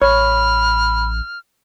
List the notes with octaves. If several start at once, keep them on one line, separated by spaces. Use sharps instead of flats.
A1 C#5 B5 F6